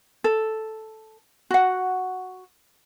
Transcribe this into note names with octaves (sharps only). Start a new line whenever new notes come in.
A4
F#4 F#5